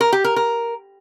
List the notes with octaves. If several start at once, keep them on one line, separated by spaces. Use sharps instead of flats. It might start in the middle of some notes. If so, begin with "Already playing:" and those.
A#4
G4
A#4
A#4